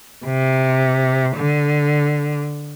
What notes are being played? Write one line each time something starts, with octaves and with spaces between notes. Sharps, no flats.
C3
D3